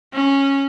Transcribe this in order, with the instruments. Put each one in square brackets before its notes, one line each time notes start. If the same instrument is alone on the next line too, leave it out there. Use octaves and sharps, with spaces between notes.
[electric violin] C#4